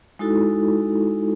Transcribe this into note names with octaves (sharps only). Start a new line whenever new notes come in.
G#3 D#4 E4 F#4 A4